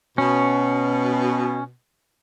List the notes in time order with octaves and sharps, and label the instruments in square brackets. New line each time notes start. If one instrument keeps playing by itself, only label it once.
[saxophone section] B2 [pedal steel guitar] C#4